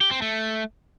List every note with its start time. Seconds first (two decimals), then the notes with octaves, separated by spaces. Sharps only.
0.01 G4
0.11 C4
0.22 A3